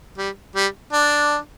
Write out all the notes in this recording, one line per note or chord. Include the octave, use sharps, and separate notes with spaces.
G3
G3
D4